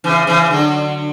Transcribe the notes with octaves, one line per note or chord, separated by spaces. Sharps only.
C#3 E3
C#3 E3
D3 F#3